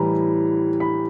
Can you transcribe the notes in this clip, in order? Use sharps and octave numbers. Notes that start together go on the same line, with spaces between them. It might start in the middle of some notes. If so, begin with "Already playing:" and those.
Already playing: A2 E3 G3 A#5
B5